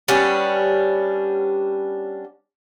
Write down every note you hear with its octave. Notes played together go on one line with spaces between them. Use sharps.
G3 B3 C#4 D4